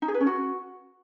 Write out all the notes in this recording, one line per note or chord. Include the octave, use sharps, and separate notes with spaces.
D#4
G#4
B4
C#4
F#4